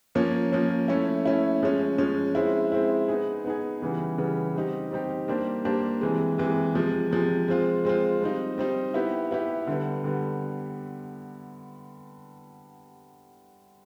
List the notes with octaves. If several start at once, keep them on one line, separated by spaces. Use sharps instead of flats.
F3 A#3 C#4
F3 A#3 C#4
A3 C#4 E4
A3 C#4 E4
F3 G#3 C#4
F3 G#3 C#4
G#3 C4 E4
G#3 C4 E4
B3 D#4 G#4
B3 D#4 G#4
C#3 E3 G3 B3
C#3 E3 G3 B3
G3 C4 D#4 G4
G3 C4 D#4 G4
G3 A#3 D4 G4 C5
G3 A#3 D4 G4 C5
C3 E3 G#3
C3 E3 G#3
C3 F3 G#3
C3 F3 G#3
G#3 C4 F4
G#3 C4 F4
G3 C4 D#4
G3 C4 D#4
B3 E4 G4
B3 E4 G4
D3 G3 B3
D3 G3 B3